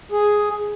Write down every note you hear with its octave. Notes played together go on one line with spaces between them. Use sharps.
G#4